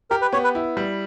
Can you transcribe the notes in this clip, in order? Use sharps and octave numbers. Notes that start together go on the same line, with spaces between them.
G4 A#4
B4
B3 C#5
B4
E4
G3